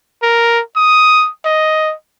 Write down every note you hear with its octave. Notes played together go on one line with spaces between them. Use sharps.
A#4
D#6
D#5